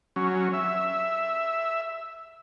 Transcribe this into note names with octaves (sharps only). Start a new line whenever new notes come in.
F#3 C#4
E5